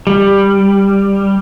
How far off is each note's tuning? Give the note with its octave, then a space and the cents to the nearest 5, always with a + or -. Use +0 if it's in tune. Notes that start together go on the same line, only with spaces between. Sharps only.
G3 +10